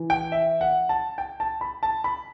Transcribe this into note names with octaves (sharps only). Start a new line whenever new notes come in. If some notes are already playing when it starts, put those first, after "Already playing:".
Already playing: E3
G5
E5
F#5
A5
G5
A5
B5
A5
B5